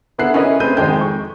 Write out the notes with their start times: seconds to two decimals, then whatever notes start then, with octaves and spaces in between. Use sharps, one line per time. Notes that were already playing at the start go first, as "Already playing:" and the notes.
0.18 D3 B3 E4 F#5 F#6 C7
0.34 C#4 E4 A#4 B4 C#5 D#5
0.60 A3 C4 B4 G6 D#7
0.77 G#1 F2 G#3 C4 G5 G6
0.98 A4 C#6